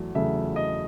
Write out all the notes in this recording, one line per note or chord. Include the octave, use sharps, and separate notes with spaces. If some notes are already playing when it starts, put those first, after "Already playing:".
Already playing: E2 F#3 A3
E2 C#3 F#3 A3 E5
D#5